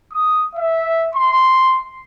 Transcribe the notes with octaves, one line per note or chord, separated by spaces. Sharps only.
D#6
E5
C6